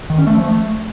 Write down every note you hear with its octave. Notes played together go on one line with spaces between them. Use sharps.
D#3
C#4
A3
F3
A3